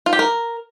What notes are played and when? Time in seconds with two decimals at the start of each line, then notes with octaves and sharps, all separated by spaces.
0.06 F4
0.13 G4
0.19 A#4